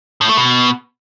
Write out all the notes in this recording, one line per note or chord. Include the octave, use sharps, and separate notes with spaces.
A2
A3
B2